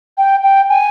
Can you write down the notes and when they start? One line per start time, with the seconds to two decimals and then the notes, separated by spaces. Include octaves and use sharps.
0.17 G5
0.43 G5
0.69 G#5